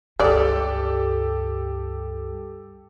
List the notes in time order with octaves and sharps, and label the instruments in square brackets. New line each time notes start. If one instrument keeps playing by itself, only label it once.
[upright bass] C#2 G2 [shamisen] G#3 D5 [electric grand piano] G4 A4